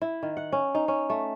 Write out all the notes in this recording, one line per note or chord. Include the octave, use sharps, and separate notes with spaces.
E4
D#3
F#5
C#4
D#4
C#4
A3